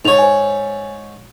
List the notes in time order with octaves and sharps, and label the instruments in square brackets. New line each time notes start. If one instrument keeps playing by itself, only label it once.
[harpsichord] G#2 C#5 [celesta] D#4 F7
[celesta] C5 G#5